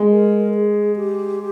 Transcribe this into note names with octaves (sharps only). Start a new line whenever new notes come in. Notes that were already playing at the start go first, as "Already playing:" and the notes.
Already playing: G#3
A#4
G#4
G4